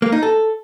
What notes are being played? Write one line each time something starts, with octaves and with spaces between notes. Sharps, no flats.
A#3
D#4
A4